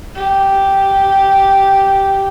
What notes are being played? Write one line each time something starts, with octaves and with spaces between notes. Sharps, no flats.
G4